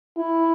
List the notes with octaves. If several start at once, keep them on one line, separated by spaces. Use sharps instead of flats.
E4